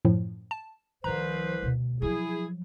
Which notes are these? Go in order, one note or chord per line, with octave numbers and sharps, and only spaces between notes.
F#2 A2 F3
A5
C2 D#3 F3 B4 C5 A#5
D2 B2
F3 F#3 E4 G#4